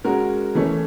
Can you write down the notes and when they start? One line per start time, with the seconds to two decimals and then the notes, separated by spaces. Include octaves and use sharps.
0.04 G#3 C#4 F#4 A#4
0.55 E3 A3 C#4